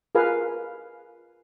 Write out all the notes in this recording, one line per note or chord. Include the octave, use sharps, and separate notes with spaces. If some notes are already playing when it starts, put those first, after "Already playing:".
F4 G#4 A#4 B4 F5